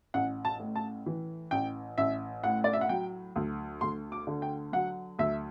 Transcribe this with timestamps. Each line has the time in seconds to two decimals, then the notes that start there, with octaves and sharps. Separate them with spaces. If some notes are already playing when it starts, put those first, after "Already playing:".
0.14 A1 F#5
0.45 A5
0.60 A2
0.76 A5
1.06 E3
1.51 A1 G5
1.98 A1 E5
2.44 A2 F#5
2.64 D5
2.73 E5
2.81 F#5
2.89 F#3 G5
3.36 D2
3.81 D2 C6
4.12 D6
4.27 D3
4.42 G5
4.73 F#3 F#5
5.19 D2 E5